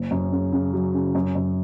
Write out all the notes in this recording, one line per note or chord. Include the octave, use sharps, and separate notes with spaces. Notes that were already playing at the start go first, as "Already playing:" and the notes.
Already playing: F#1
F#2
C#3
C#3
F#3
C#3
F#2
F#2